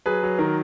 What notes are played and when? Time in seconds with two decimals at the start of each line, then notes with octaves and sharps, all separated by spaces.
0.06 F#3 G#4 B4
0.23 F#3
0.39 D#3 A#4